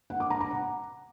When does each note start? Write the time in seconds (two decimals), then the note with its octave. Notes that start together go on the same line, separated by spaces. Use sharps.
0.10 F#5
0.20 D6
0.30 A#5
0.41 A#5
0.51 F#5